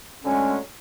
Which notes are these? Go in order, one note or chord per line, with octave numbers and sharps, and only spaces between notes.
D3 F#3 G#3 A3 C#4